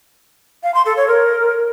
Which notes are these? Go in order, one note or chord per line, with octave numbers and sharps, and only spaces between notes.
F5
C6
A4
C#5
A#4